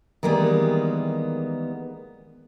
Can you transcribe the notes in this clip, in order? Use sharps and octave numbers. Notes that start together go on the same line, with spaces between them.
D#3 E3 G3 G#3 A#3 B3